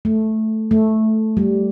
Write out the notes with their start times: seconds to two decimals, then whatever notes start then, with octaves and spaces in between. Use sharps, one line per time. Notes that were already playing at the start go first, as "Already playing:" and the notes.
0.05 A3
0.71 A3
1.37 G3